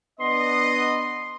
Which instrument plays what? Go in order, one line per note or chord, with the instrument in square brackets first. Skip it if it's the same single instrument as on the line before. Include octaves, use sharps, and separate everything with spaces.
[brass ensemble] B3 D4 D#5 [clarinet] C6